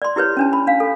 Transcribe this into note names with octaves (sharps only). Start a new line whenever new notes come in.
D5 C6
E4 G4 B4 C#5
C#4 D4 A5
B5
D4 F5
A4